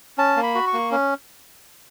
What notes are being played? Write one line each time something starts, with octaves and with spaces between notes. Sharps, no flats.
C#4 A5
A#3
B5
F#4
C#6
A#3
C#4